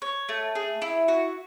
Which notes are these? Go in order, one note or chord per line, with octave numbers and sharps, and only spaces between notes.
C#5
A3
G#4
E4
F#4